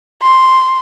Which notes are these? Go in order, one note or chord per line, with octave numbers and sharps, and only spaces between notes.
C6